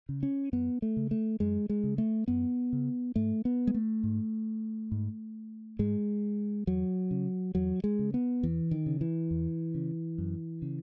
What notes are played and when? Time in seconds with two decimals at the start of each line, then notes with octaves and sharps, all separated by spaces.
0.09 C#3
0.23 C#4
0.53 F#2 B3
0.82 A3
0.97 C#3
1.11 A3
1.40 F#2 G#3
1.69 G#3
1.84 C#3
1.98 A3
2.28 F#2 B3
2.73 C#3
3.16 G#2 A3
3.45 B3
3.67 G#3
3.74 A3
4.03 G#2
4.92 G#2
5.79 G#2 G#3
6.67 E2 F#3
7.11 C#3
7.55 E2 F#3
7.84 G#3
7.99 C#3
8.14 B3
8.43 E2 E3
8.71 D#3
8.86 C#3
9.01 E3
9.31 E2
9.75 C#3
10.18 F#2
10.62 C#3